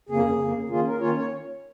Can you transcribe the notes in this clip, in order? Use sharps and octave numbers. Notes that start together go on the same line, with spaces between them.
F2 C#3 A#3 G#4
F2 C#3 A#3
D#3 A#3 C#4 F4 G#4
A#4
D#3 A#3 C#4 F4 C#5
C#5